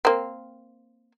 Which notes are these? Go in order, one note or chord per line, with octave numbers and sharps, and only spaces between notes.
A#3 C4